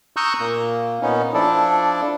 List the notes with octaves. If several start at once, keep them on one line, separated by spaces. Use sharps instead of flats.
A#5 C#6 D#6 E6 F#6 G6
A#2 A#3
A#2 B3 C#4 D#4
F3 D4 E4 A4 D5